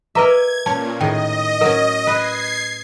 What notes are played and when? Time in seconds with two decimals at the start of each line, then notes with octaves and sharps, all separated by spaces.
0.15 A#4 B4 D#5 E5 A#5 D6 G#6
0.66 A#2 C#4 C#5 A5
1.01 A2 D#3 G#4 D#5 G5
1.61 F#3 C#4 A#4
2.07 B4 G#6 C7